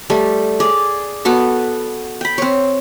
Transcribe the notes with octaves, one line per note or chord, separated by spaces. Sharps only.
G3 A3
G#4 D5
B3 F#4 A4
G5 B5
C4 C#5